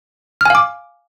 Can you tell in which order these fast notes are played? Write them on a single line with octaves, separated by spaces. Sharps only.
F6 G#5 F5 D6